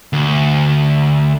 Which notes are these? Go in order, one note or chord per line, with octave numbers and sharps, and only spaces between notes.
D2